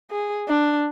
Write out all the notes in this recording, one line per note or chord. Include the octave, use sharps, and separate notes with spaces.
G#4
D4